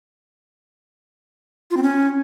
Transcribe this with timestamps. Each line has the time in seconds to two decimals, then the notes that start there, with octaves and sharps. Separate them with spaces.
1.71 F4
1.77 C4
1.83 C#4